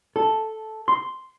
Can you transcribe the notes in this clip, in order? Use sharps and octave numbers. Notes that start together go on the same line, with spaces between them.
A4
C6